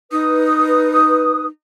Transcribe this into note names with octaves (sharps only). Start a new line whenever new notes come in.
D#4 B4 D#6